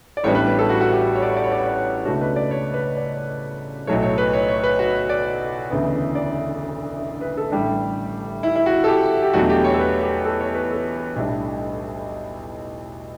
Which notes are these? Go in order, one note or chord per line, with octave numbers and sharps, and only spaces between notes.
D5
A1 A2 G3 B3 D4 C#5
B4
B4
A4
F#4
F#4
G4
C#5
D5
C#5
D5
C#5
D5
C#5
D5
C#5
C#2 B2 A3 D4 F#4
B4
D5
C#5
B4
D5
B1 A2 F#3 A3 C#5
C#5
B4
C#5
C#5
B4
F#4
D5
E1 D2 C#3 E3 B3
D5
B4
A4
A1 A2 G3 D4 G4
E4
E4
F#4
A4
G4
G4
E2 B2 F#3 A3 D4 F#4
G4
C#5
A4
B4
G4
A4
C#5
B4
A4
B1 A2 G3 D4